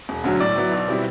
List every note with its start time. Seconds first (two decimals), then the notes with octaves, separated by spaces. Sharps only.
0.09 E1
0.24 D2 D3 F#3
0.40 A2 D5
0.56 F#3 B3 E4
0.71 B1
0.88 B2 G3 C4 E4